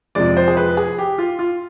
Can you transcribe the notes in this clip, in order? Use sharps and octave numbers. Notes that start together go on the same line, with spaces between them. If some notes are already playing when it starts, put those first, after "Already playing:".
F2 C3 F3 G#3 D5
C5
G#4
B4
G#4
G4
F4
F4